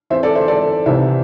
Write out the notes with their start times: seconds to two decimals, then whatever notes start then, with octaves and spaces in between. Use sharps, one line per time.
0.10 E2 E3 C4 C5 E5
0.23 A4 D5
0.35 C5 E5
0.48 A4 D5
0.86 C2 C3 E3 C4 E5